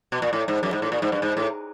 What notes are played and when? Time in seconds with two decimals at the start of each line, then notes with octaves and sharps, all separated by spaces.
0.12 B2
0.22 A#2
0.33 A2
0.48 G#2
0.63 F#2
0.73 G#2
0.82 A2
0.92 A#2
1.02 G#2
1.12 G2
1.22 G#2
1.37 A2